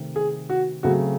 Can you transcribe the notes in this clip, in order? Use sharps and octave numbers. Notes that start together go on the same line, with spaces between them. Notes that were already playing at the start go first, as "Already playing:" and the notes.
Already playing: C3 D#3 A3 C4
G#4
F#4
C#3 F#3 A3 C4 F#4